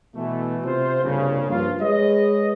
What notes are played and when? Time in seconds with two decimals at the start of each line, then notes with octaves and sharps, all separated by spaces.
0.15 B2 E3 A3
0.65 C3 F4 C5
1.03 C2 G2 A#2 C#3
1.49 G2 F3 A#3 F4
1.81 G#3 B4 C#5 D#5